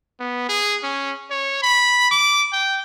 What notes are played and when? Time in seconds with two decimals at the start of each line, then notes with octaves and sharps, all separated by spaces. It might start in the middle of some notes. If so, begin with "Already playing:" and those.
0.20 B3
0.49 G#4
0.83 C#4
1.31 C#5
1.63 B5
2.11 D6
2.53 G5